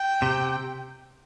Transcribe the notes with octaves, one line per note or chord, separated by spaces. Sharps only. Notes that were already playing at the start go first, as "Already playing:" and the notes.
Already playing: G5
C3